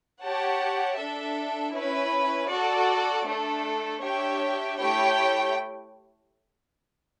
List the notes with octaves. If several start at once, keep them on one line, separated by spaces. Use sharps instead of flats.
G4 C#5 F#5 A5
D4 A4 E5
C#4 E4 B4
F#4 A4 D5
A3 D4 A4
D4 G4 C#5 E5 G5
A3 E4 G4 C#5 G5